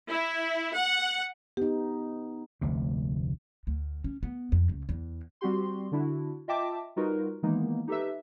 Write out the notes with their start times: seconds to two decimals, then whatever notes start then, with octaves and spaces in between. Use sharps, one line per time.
0.11 E4
0.75 F#5
1.57 B3 D#4 G4
2.61 F1 D2 C3
3.67 D2
4.04 C#4
4.23 B3
4.52 F2
4.69 C#2
4.89 E2
5.41 G3 C4 F#4 G4 C6
5.92 D3 D4 E4 F#4
6.48 F4 D#5 E5 G5 A5 D6
6.96 G3 D#4 F4 F#4 A#4 B4
7.43 D#3 E3 G#3 A#3 B3 D#4
7.88 D#4 G4 A4 B4 E5